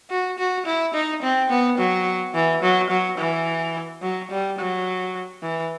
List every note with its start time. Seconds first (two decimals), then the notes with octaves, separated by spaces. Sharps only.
0.10 F#4
0.38 F#4
0.66 E4
0.94 D#4
1.22 C4
1.49 B3
1.78 F#3
2.34 E3
2.62 F#3
2.90 F#3
3.18 E3
4.02 F#3
4.31 G3
4.58 F#3
5.42 E3